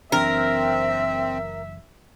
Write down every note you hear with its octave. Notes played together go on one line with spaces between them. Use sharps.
F#1 E3 C4 D4 A#4 E5